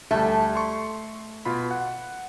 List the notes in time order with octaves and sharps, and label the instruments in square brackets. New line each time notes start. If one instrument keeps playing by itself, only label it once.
[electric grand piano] D2 G3 [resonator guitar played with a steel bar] A3
[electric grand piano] C6 C#6
B2 F4 B5
F#5